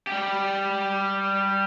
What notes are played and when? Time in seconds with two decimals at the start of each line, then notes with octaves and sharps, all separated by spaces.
0.07 G3 G4